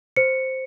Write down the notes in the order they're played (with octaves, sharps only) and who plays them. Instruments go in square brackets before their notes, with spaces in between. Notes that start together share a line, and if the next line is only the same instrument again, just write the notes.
[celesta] C5 C#7